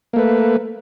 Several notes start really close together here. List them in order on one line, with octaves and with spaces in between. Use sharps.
A#3 A3 B4